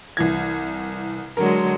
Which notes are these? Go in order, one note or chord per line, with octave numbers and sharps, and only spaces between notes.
C2 E3 G#6
D3 F#3 G#3 A#4